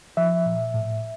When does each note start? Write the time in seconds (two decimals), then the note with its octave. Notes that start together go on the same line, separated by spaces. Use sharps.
0.17 F3 E5
0.46 A#2
0.74 A2